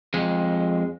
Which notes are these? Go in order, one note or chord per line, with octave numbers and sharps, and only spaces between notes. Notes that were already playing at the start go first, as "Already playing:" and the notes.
F2 G#3